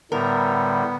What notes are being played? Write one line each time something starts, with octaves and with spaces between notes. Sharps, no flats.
A2 D3 G3 B3 A#4